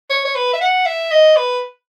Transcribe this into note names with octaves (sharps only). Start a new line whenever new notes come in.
C#5
C#5
B4
E5
F#5
E5
D#5
B4